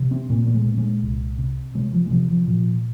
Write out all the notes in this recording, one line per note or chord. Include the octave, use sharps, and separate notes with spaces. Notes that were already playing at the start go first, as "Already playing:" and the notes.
Already playing: C3
C4
A#2 A#3
A#3
G#3
A#2
A#3
G#3
C2
C3
C3 G#3
F3
G#3
C3 F3
F3
A#2 F3